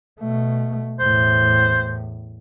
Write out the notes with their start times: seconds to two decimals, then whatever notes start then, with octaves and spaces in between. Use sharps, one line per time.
0.20 B2 A3
1.00 E2 A2 C5